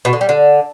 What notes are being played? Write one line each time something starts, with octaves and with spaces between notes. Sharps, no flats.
B2
D3
G3
D3